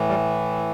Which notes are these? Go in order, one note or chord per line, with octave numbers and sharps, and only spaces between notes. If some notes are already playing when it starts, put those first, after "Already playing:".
Already playing: A2 E3
G3